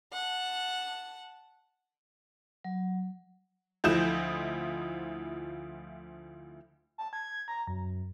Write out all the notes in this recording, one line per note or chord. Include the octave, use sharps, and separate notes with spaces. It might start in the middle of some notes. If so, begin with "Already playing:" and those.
F#5 A5
F#3
D2 F3 E4 D#5 G6 E7
A5
G#6
A#5
F#2